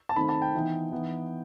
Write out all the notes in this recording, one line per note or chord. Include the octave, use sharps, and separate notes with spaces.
A5
D#3 A3 C4 D#4 B5
A5
G5
E3 B3 D#4
E3 B3 D#4